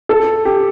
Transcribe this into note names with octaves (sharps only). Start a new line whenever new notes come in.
A4
G4